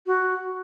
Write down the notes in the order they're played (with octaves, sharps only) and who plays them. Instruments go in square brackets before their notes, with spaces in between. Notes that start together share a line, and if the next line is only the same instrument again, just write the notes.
[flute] F#4